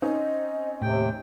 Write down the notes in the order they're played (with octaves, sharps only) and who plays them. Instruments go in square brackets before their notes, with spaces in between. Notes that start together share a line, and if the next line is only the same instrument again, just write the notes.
[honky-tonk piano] C4 C#4 D#4 [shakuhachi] D#5
[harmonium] D#2 C3 G5 [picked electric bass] A2